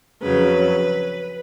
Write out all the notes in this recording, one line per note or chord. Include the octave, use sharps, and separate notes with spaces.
F2 C#3 F#3 B4